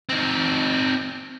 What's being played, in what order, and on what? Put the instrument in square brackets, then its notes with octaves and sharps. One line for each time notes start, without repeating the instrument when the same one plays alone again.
[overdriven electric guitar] C4 D#4